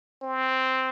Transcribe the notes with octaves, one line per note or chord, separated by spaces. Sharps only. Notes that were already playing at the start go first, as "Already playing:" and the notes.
C4